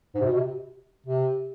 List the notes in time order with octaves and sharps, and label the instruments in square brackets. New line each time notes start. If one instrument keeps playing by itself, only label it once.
[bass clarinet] G#2
C3
B2
C3
C3